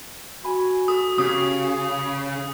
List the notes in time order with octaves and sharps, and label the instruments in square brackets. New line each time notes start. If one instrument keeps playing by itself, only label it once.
[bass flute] F#4 [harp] G#5 B5
[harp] A4 [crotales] D#6
[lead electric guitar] C#3 [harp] C#4 G4 [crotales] D#6